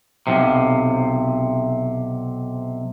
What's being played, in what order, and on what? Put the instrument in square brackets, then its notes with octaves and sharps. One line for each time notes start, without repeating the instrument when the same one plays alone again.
[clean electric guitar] B1 C3